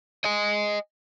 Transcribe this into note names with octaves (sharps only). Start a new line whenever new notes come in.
D#5 G#5